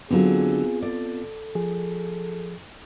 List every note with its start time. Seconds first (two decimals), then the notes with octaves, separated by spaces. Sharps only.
0.11 D3 F#3 B3 C4 F4 G#4
0.82 A4 D5
1.55 F3 G#4